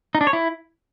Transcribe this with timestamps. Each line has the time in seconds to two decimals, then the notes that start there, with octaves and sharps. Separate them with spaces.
0.15 D#4
0.21 D4
0.27 C#5
0.33 E4